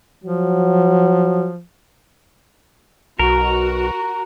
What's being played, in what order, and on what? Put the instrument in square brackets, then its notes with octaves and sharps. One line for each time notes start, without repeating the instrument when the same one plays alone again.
[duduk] F3 [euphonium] F#3
[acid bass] B1 [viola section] F#4 [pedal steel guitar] A#4